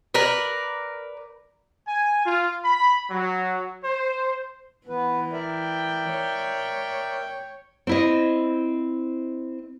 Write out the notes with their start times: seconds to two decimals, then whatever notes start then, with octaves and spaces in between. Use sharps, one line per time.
0.14 A#4 B4 D5
1.88 G#5
2.25 F4
2.65 B5
3.11 F#3
3.84 C5
4.87 E3 B3 B4
5.32 A#4 D5 E5 G5
6.12 C#5
7.87 C4 E4 D#5